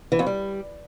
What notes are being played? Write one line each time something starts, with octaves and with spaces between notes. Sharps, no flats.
E3
F2
G3